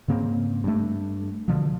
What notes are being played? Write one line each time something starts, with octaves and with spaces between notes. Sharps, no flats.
G#2 C#3 A#3 C4
G2 A3
B2 D3 F3